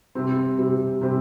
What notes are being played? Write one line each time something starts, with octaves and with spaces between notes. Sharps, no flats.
C3 G3 C4
C3 G3 C4
C3 G3 C4